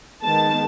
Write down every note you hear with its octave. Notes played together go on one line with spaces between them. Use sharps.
D#3 G#3 B3 A5